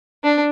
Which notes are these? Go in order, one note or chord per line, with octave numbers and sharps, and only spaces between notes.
D4